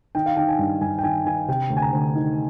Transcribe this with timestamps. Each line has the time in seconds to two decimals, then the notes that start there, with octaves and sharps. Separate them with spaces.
0.15 D#3 G5
0.26 F5
0.37 D#3 G5
0.49 G#5
0.59 G2
0.81 G2 G#5
0.99 G5
1.04 D#3 G#5
1.25 D#3 G#5
1.48 C3 G5
1.70 D2
1.77 G#5
1.82 A#5
1.93 D2
2.15 D#3